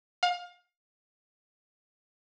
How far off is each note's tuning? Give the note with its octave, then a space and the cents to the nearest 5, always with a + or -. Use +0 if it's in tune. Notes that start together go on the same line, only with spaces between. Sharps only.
F5 +30